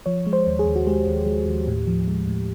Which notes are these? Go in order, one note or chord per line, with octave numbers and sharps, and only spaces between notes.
F3 C#5
G#3
C5
D#2
G#4
D#2
F#4
G#3 G4
D#2
G#3
D#2
A2
F3
G#3
A2